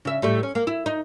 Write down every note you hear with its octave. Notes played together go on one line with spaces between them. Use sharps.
C#3 E5
A2 G3 A3
C#4
A#3
E4
D#4